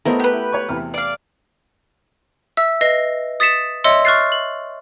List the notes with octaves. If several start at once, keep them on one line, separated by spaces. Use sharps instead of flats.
A3 B3 E4 A#4 C5 D#5
G4 B4
E4
C#5 C#6
E2 C3 F6
D5 F5
E5 E6
B4 D#5 A#6 C7
D#6 A6 B6 C#7 E7
C#5 D#5 E5 C6 E6 C#7
C#6 F6 F#6 A6 C7
F#7